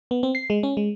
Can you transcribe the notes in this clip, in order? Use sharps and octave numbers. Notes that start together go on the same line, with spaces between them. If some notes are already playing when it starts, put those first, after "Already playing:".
B3
C4
C7
G#3
C#4
G#3